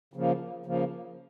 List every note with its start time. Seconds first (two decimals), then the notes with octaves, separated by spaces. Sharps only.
0.14 C#3 F3 A#3
0.66 C#3 F3 A#3